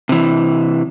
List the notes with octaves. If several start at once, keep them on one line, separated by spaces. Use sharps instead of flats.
C3 E3